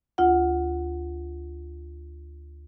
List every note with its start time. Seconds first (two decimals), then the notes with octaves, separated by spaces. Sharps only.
0.18 D2 F4 F#5